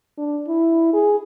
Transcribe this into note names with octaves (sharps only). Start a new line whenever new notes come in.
D4
E4
G#4